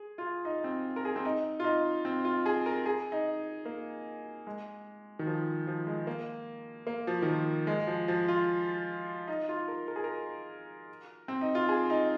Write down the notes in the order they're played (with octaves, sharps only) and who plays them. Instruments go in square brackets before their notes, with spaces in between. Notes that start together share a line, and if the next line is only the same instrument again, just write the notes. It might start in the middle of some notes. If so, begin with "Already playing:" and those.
Already playing: [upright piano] G#4
F4
D#4
C4
A#4
G#4
C4
D#4
F4
D#4
C4
F4
G#4
A#4
G#4
D#4
A#3
G#3
D#3
F3
F3
G#3
A#3
A#3
F3
D#3
F3
G#3
F3
F3
F4
D#4
F4
A#4
A#4
G#4
A#4
C4
D#4
F4
G#4
D#4